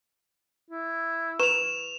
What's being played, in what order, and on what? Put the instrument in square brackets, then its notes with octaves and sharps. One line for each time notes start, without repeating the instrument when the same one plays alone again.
[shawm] E4
[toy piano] B4 A#5 C#6 [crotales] E7 F7